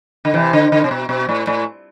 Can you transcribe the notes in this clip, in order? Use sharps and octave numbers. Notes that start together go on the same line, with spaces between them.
D3
C3 E3
D3
D3
C3
B2
B2
A2
A2